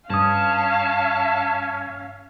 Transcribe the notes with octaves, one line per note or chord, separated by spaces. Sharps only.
G2 C#4 F5 A5 D#6